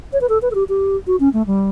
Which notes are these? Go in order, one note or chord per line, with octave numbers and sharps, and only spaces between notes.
C#5
B4
A4
B4
A4
G4
G4
F#4
C#4
A3
G3